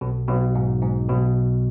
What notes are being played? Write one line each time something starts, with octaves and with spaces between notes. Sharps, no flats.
B1 B2
B1 B2
G#2
G#2
B1 B2